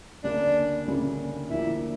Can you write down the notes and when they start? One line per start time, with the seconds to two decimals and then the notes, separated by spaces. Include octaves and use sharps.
0.24 D2 C#3 G3 A#3 C#4 D4
0.87 D2 C#3 G3 A#3 C#4
1.50 D2 D3 F3 A#3 D4 E4